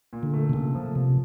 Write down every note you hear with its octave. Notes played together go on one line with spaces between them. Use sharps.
A#2
D3
A3
C3
A#2 C#3
F3
C3 F3